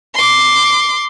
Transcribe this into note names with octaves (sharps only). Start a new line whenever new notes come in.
C6 D6